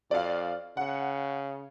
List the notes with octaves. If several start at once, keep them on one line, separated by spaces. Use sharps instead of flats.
F2 D5 F5
C#3 F#5